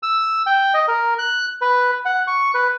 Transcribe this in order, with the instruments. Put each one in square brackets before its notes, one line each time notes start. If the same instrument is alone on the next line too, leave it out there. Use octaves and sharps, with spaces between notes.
[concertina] E6
G5
D#5
A#4
F#6
B4
F#5
C#6
B4